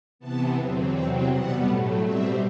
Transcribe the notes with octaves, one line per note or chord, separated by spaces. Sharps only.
C3 E3 B3 A5
E2 D3 F#3 C4
E2 C3 F#3 C4 G5
B2 G3 B3 F#5
A2 F#3 A3
B2 G3 C4 E5